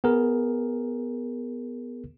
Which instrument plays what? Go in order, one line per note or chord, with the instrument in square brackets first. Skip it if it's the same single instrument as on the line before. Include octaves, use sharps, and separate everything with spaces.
[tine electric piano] B3 G#4 A#4